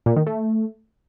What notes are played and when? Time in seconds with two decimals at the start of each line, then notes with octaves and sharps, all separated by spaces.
0.06 A#2
0.16 D#3
0.27 A3